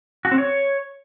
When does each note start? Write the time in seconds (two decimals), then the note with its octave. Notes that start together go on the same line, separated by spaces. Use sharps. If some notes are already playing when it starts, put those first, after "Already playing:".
0.25 F#4
0.31 C4
0.38 C#5